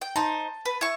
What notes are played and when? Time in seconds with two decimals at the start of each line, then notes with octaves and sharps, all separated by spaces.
0.01 G5
0.16 D#4 C5 A5
0.65 B4
0.81 E4 C#6